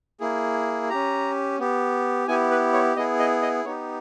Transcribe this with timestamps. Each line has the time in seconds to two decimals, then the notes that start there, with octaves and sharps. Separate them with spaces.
0.20 A#3 E4 G#4
0.90 C#4 G4 A#5
1.59 B3 G4
2.28 B3 E4 G4 G#5
2.51 B4
2.73 C#5
2.96 B3 E4 G#4 D#5
3.19 D#5
3.42 D#5
3.65 B3 D#4 G4 C#5